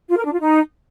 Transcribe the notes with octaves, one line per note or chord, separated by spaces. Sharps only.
F4
A#4
D4
F4
D#4